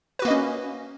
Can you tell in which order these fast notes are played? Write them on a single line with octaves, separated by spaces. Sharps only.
B4 F#4 A#3 D#5 C#4